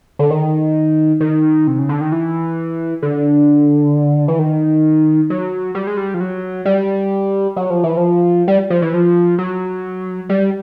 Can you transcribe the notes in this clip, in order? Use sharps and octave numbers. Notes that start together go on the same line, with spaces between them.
D3
D#3
D#3
C3
C#3
D3
D#3
E3
D3
E3
D#3
F#3
G3
G#3
G3
F3
F#3
G3
F#3
F3
E3
F3
G3
F3
E3
F3
F#3
G3